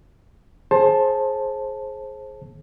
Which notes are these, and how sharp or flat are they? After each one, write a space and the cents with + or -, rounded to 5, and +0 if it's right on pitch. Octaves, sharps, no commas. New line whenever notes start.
G#4 +20 C5 +25 A5 +0